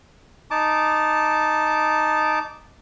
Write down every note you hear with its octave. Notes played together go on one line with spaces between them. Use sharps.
D#4 A5 D6